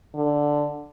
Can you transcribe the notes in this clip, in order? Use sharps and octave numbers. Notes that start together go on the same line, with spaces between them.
D3